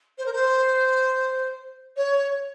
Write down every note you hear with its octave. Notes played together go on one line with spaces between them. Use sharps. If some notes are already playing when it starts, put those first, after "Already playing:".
C5
A#4
C5
C#5